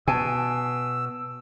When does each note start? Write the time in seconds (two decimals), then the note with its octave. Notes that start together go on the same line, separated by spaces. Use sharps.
0.08 B2 G#5 A5 E6